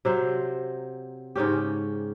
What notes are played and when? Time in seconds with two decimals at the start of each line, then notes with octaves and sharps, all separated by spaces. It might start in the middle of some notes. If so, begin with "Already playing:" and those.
0.05 C3 F#3 C5
1.36 G#2 C#3 C#4 G4